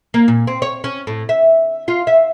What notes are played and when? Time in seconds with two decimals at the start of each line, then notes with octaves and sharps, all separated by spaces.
0.14 A#3
0.28 A#2
0.47 C4
0.62 C#5
0.84 C#4
1.07 A2
1.29 E5
1.88 F4
2.07 E5